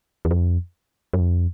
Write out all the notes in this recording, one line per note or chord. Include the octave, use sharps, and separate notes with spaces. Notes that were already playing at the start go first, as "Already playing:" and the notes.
E2
F2
F#2
F2